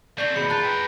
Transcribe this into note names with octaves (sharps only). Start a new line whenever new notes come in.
A3 C4 D5 C#6 G6 C7 G7
D#2 B2 G#4 B5 C#7
F4 A5 A#5 F#6 A6 D#7
B4 G5